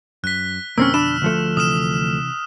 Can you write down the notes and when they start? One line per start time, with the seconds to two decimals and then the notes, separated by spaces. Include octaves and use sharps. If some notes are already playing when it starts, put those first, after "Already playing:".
0.24 F#2 F#6 B6
0.78 F2 B2 D3 A#3 C4 C#4 E6 F6
0.94 D4 B5 E7
1.22 D2 F3 A3
1.57 C3 E3 D#6 F6 E7